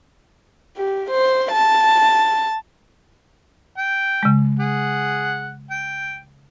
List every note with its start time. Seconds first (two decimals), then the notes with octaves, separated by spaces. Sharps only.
0.77 G4
1.10 C5
1.51 A5
3.78 G5
4.23 C#3 G#3
4.60 G#4 F#5
5.71 G5